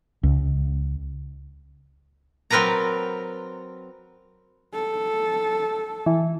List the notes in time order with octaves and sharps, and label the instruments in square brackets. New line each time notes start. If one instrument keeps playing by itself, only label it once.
[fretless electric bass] C#2
[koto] F#3 C4 A#4 B4 D5 A#5
[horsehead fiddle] A4
[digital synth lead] E3